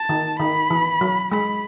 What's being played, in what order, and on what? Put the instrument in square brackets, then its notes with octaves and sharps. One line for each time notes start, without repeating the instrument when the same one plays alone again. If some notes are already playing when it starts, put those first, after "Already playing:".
Already playing: [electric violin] A5
[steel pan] D#3
[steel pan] D#3 [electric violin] B5
[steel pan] E3
F#3
[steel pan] G#3 [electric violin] B5